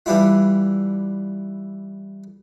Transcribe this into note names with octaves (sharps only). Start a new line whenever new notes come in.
E3 G3 D4 E4 F4